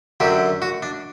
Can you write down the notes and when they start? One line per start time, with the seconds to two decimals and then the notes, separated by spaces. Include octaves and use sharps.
0.20 F#2 D3 F#3 G4
0.62 F#4
0.83 D4